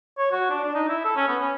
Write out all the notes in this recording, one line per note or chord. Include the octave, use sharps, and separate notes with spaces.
C#5
F#4
D4
D4
D#4
E4
A4
C#4
B3
C#4